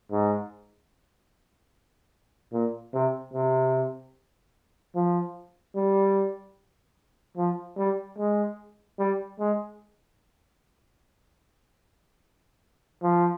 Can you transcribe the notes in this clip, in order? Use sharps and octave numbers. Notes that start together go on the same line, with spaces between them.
G#2
A#2
C3
C3
F3
G3
F3
G3
G#3
G3
G#3
F3